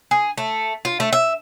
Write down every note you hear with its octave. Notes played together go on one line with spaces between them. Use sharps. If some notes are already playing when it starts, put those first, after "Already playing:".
G#4
A3
F4
A3
E5